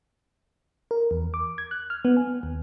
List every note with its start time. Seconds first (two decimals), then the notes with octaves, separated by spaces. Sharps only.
0.91 A#4
1.11 E2
1.34 D6
1.58 G#6
1.71 F#6
1.90 F6
2.05 B3
2.17 G#5
2.43 D#2